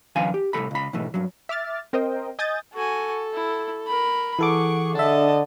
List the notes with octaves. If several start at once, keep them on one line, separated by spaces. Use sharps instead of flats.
F#2 D3 E3 F5 G#5 C6
G4
C2 A2 D#3 A4 B5
C#2 B5
G#2 B2 E3 A3
G2 F#3
E5 D6 F6 A6
C4 A#4 C5 D#5 G5
D#5 G#5 D#6 G6 A6
F#4 A4 G#5
E4
A#4 B5
E3 G#4 A4 F#5 C#6 D6
D3 D4 A4 D#5 E5 A5